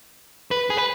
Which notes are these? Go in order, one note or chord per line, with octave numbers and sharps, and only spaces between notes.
B4
G#4
B4